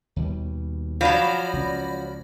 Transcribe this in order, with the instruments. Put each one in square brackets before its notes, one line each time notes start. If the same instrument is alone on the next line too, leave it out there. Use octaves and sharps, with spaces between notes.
[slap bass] D#2 B2 G3
[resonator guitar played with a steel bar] F3 F#3 [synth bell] D5 B5 A#6
[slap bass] C#2 C#4